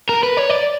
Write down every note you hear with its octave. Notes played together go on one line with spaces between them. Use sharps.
A#4
B4
C#5
D5